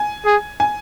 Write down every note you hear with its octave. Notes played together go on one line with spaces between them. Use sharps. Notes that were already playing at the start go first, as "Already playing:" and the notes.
Already playing: G#5
G#4
G#5